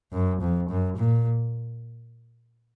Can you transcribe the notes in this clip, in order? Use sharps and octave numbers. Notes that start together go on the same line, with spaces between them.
F#2
F2
F#2
A#2